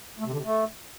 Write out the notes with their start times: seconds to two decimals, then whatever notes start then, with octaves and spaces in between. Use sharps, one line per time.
0.20 A3
0.26 C3
0.32 D3
0.38 C3
0.44 A3